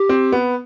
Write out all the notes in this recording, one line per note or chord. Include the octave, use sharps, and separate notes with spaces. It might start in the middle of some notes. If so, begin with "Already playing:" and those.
Already playing: G4
C4
B3